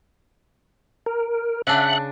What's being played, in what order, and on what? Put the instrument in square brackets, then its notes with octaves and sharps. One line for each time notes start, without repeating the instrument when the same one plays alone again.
[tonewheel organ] A#4
[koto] C#3 D4 [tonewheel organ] E5 F#5 F#6